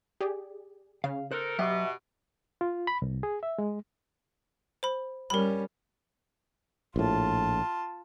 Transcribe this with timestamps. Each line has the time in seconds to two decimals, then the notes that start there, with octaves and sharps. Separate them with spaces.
0.21 G4 G#4 D5
1.04 C#3 F5
1.31 D#4 A4 A#4 C5 F#6
1.59 B2 F#3 G4 E5 D6
2.61 F4
2.87 B5
3.02 C2
3.23 G#4
3.43 E5
3.58 G#3
4.83 C5 B5
5.30 G3 C#4 A#4 B5
6.96 A#1 A2 F4 A5